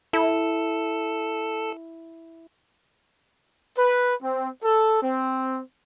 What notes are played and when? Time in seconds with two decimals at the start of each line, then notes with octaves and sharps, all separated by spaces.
0.13 E4 A4
3.78 B4
4.23 C4
4.63 A4
5.02 C4